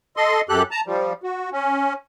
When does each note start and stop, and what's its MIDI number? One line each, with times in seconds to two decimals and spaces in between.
0.17 0.41 69
0.17 0.41 75
0.17 0.41 84
0.49 0.63 42
0.49 0.63 67
0.49 0.63 69
0.49 0.63 90
0.71 0.81 81
0.71 0.81 82
0.87 1.13 53
0.87 1.13 55
1.23 1.50 66
1.53 1.93 61